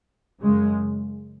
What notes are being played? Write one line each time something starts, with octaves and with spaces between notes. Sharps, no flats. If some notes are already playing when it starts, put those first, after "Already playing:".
F#2 C#3 G#3